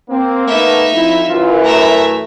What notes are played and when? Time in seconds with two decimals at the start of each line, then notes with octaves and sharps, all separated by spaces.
0.10 A#3 C4
0.47 A3 B3 D#4 E5
0.93 F2 E4
1.30 F#2 E3 F4
1.64 A3 E5 A#5